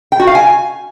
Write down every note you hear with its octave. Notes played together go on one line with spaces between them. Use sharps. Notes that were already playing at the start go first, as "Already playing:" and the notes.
G5
F#4
F5
G#5